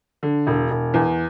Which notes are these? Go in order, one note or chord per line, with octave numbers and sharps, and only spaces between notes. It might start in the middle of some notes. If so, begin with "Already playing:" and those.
D3
E1
E1
E2